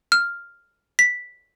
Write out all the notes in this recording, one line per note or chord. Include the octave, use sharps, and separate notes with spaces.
F6
B6